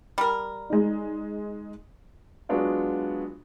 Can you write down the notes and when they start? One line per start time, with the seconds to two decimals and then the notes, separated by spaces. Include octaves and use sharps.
0.18 G3 A#4
0.70 G#3 D#4
2.49 F#3 G#3 B3 D4 F4 F#4